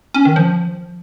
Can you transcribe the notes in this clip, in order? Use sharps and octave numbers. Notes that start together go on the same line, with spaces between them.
C#4
D#3
F3